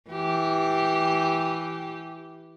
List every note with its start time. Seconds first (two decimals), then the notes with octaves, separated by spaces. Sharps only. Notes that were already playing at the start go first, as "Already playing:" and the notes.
0.10 E3 G4